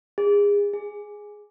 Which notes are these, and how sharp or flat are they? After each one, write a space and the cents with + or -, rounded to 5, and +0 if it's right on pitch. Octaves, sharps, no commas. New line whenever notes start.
G#4 -30
G#4 +0